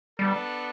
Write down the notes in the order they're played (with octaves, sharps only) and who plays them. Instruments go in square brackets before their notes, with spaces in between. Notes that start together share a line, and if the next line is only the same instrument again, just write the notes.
[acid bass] G3 [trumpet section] B3 D4 A4